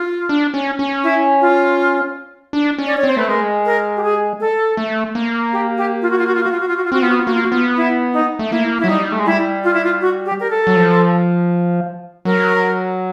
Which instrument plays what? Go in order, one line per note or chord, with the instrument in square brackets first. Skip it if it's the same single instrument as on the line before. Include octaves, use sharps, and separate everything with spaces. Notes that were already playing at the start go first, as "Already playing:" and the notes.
Already playing: [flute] F4
[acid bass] D4
C#4
C#4
[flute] E4
F4
[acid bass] D4
C#4
[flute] D5
C#5
[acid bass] C4 [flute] C5
[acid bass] A3 [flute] B4
[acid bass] G#3 [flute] A#4
[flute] A#4
G4
G#4
A4
[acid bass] A3
A#3
[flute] G4
G4
F4
F#4
F4
F#4
F4
F#4
F4
F#4
F4
F#4
F4
[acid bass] C4 [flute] F#4
[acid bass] B3 [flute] F4
[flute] F#4
F4
[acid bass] A#3 [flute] F#4
[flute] F4
F#4
[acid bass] B3 [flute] F4
[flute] E4
D#4
[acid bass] A3
[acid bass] A#3 [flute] E4
[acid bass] F#3 [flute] E4
[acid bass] G3 [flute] D#4
[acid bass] A3
G#3
[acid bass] G3 [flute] E4
[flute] F4
E4
F4
F#4
G4
A#4
A4
[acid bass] F#3
F3
[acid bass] F#3 [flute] A#4